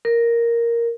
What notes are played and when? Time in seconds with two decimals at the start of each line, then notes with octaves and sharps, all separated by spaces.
0.05 A#4